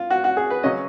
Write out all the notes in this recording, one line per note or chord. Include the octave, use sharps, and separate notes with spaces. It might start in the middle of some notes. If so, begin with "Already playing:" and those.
Already playing: F4
F#4
F#4
G#4
B4
C#3 F#3 C#4 D#5